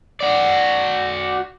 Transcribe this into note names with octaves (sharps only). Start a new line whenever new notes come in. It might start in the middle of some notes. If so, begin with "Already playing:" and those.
F#4 D5